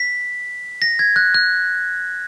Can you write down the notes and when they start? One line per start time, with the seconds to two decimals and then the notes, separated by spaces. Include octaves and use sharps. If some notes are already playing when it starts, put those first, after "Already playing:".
Already playing: B6
0.82 A#6
0.99 G#6
1.16 F#6
1.35 F#6